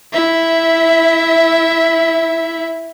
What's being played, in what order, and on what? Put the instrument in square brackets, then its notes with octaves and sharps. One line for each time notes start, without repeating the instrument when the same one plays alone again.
[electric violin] E4 E5